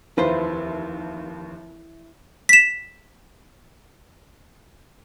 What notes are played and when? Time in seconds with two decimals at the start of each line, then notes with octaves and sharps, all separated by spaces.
0.18 F1 D#2 E4 F4 B4 C5
2.49 B6 E7